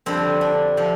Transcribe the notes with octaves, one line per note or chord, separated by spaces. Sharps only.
F2 D3 G3 C4
D4
C3 F3